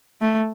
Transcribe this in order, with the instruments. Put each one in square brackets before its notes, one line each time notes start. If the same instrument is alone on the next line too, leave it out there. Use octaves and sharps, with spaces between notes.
[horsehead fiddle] A3